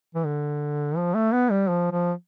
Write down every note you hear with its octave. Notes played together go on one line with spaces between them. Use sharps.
E3
D3
F3
A3
B3
G3
F3
F3